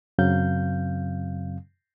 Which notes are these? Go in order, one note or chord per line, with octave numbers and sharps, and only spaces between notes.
F#2 C#3 F#3 C4 F5 G6